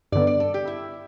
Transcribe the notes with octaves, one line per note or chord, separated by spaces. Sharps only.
G2 D3 B3 D5
D5
A4
G4
E4